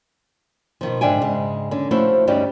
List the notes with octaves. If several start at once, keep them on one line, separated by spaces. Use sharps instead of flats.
B2 D#3 F3
G#2 D3 D4 E5 G5 G#5
G#2 C#3 G#3
D3 C#4
F3 A3 C#4 E4 F#4 C5
D2 G2 G3 C#4 D#4 D5